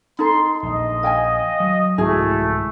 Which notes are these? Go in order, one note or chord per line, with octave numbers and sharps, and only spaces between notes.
D#4 A4 C6
A#1 D#5
F5 G5 G#5
F#3
C2 G#2 A3 E4 F#4 G#4